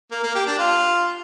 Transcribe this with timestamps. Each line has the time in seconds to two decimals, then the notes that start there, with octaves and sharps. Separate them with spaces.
0.11 A#3
0.23 A#3
0.35 G4
0.47 D4
0.58 F4